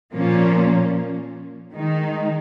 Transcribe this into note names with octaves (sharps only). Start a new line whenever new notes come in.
A#2 F3 A#3 C#4
D#3 G#3 D#4